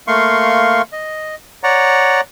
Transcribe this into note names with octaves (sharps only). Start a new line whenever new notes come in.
A3 A#3 F5 C6 C#6
D#5
C#5 D5 F#5 A#5